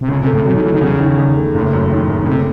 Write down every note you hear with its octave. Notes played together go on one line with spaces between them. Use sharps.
C3
C#2 C#3
C3
A3
A2
C3 F#3
D#3
E3 A3
D#3
E2 C#3
D#3
E2
A3
F#1 A2
F#2
D#3
F#1
C#3
A2 C3